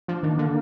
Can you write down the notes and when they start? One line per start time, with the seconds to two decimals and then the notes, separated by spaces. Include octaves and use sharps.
0.08 F3 D4
0.23 D#3
0.31 A#3
0.38 D3